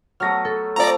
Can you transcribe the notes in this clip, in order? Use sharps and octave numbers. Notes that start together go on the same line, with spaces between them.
F#3 A3 B3 F6 A#6
A4
F3 A3 C4 D5 A#5